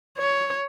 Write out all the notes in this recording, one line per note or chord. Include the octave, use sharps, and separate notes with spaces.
C#5